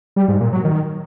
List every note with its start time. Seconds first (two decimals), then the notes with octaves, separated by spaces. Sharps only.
0.16 G3
0.28 G#2
0.40 A#2
0.52 F#3
0.64 D#3